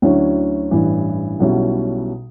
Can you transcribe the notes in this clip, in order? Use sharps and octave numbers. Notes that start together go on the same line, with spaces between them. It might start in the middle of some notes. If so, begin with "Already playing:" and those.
D2 D3 F#3 C#4 E4
A1 G2 E3
B1 B2 G3 C#4 E4